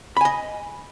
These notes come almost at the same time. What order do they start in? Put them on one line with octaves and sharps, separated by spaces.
B5 G#5 D#5